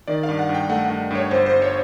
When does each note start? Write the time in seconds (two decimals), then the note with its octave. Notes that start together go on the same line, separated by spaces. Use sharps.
0.07 D#3 D5
0.23 F5
0.29 G2
0.39 F#5
0.49 G2
0.54 G5
0.69 A3 F#5
0.85 G2 F#5
1.11 G2 C#5
1.31 G1 C5
1.46 C5
1.52 G2
1.62 C#5